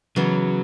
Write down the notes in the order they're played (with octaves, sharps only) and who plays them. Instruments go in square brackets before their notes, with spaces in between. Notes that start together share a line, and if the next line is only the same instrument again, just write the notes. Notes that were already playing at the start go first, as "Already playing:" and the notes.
[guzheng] C#3 E3 B3 [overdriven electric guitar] F#3